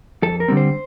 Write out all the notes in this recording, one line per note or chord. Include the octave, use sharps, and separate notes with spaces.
F2 A4
A#4
D3 G3 C4
C5